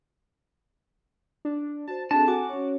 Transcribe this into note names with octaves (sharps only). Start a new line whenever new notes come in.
D4
F#4 C5 A5
C4 D4 G#4 A4 A5
F#4 G#5 D6
C#4 C#5